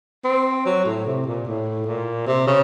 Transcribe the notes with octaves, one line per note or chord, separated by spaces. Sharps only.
C4
F#3
A2
C3
A#2
A2
A#2
C3
C#3